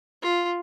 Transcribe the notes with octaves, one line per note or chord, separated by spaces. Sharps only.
F4